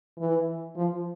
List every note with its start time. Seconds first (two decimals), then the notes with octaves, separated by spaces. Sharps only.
0.18 E3
0.76 F3